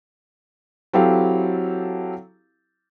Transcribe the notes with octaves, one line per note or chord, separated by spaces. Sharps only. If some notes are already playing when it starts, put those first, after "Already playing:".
F#3 C4 E4 G4 A4 F5